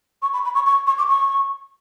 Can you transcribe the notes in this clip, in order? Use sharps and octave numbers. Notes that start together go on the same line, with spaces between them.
C#6
B5
B5
C#6
C#6
C#6
D6
C#6